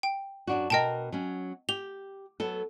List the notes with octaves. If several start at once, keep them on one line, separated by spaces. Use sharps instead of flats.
G5
F#2 D4 F#4
B2 A#4 D#5 G5 A5
F#3 C#4
G4 F7 G7
F#3 B3 A4